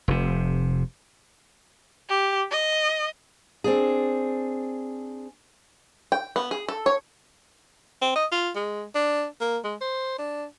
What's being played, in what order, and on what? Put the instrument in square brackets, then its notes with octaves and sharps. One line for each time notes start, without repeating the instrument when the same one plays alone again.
[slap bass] F1 C3
[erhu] G4
D#5
[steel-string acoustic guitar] C4 D4 G#4
[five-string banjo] G5
B3
G#4
A4
C#5
[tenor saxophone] C4
D#5
F4
G#3
D4
A#3
G#3
C5
D4